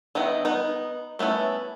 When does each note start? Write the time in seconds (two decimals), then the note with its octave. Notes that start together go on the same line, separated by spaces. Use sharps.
0.15 D#3 B3 D#4 E4
0.45 B3 D#4
1.19 A3 B3 C#4 E4